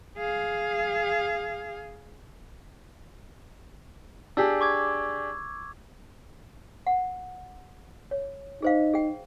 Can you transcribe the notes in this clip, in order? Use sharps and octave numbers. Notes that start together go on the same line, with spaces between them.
G#4 F5
D4 G4 G#4 E6
C#6 D6 G#6
F#5
C#5
D#4 G#4 C5 F5
G#4 G5